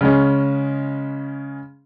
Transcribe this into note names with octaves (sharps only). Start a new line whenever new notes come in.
C#3 G#3 C#4